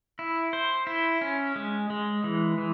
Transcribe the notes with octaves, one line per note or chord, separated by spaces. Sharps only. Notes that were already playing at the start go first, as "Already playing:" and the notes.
E4
C5
E4
C#4
G#3
G#3
E3
E3